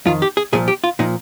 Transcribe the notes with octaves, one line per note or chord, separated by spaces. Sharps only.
F2 D#3 F4
G4
G#4
C2 A#2 F3 G#4
G4
F4
A#2 F3 D#4